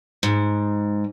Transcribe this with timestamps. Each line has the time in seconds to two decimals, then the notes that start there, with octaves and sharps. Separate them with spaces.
0.23 G#2